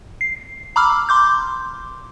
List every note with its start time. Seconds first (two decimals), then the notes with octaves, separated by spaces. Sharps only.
0.21 C7
0.76 A#5 B5 D6 E6 F6
1.09 C6 D6 G6